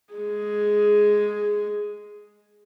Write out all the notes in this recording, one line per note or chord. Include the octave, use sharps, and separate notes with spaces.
G#3 G#4